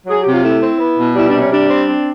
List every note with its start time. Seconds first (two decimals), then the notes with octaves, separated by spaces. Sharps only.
0.07 F#3 G#4
0.20 G4
0.25 C3
0.31 F4
0.44 A3 E4
0.61 C4
0.79 B3
0.97 B2
1.15 G3 E4
1.27 D4
1.33 C3
1.39 C#4
1.51 G3 D4
1.69 C4
1.86 C4